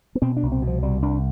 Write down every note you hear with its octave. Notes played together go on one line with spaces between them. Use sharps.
B3
B2 C4
D4
C2
C4
B2
F3
C2 G3
C2 D4